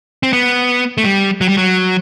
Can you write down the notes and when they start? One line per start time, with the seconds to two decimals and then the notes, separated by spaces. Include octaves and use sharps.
0.23 C4
0.33 B3
0.98 A3
1.05 G3
1.41 F#3
1.48 G3
1.58 F#3